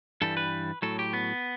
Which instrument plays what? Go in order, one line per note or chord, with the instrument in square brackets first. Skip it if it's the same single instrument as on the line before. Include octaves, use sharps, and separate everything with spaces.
[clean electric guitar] G2 E3 G3 A4
B4
A2 F#3 A4
G4
B3